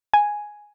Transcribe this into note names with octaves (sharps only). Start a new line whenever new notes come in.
G#5